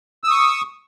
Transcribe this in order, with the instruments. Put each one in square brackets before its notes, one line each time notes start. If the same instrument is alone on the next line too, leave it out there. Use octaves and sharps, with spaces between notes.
[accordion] E6
D#6
C#6